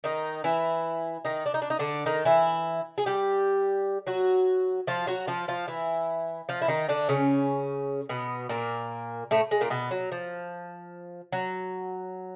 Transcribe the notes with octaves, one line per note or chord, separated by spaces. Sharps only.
D#3 D#4
E3 E4
D#3 D#4
D4
D#4
D4
D#4
D3 D4
D#3 D#4
E3 E4
G#4
G3 G4
F#3 F#4
F3 F4
F#3 F#4
F3 F4
F3 F4
E3 E4
F3 F4
E4
D#3 D#4
D3 D4
C#3 C#4
B2 B3
A#2 A#3
A2 A3
G#3
A#2 A#3
B2 B3
F#3
F3
F#3